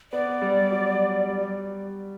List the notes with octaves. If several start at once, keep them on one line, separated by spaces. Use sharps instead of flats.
B3 D5
G3
F#3
G3